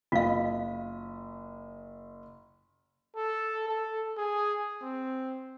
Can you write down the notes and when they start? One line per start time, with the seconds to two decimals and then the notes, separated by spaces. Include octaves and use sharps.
0.12 F#1 F4 D#5 F5
3.16 A4
3.68 A4
4.17 G#4
4.82 C4